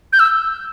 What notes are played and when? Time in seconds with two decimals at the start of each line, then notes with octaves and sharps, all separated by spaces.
0.13 G6
0.20 E6